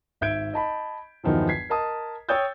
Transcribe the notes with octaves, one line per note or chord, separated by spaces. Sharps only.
G#1 E5 G6 G#6 D7
D#5 A5 B5
G1 E2 D#3 F3 F#3
G#6 B6 C7
A#4 D#5 A5 D#6
C#5 G5 D#6 E6 G6 A6